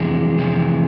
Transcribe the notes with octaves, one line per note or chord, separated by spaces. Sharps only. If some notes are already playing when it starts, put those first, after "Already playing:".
Already playing: F2 C3 E3 G#3
F2 C3 E3